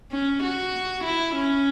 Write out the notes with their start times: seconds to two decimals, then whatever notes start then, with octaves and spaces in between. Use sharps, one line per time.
0.11 C#4
0.43 F#4
1.04 E4
1.35 C#4